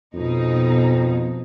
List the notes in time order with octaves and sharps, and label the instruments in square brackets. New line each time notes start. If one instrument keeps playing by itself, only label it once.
[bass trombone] F2 [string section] B2 D#4